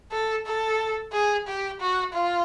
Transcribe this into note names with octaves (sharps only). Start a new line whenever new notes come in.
A4
A4
G#4
G4
F#4
F4